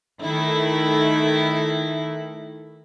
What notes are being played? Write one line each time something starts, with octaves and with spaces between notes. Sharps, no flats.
D#3 A3 E4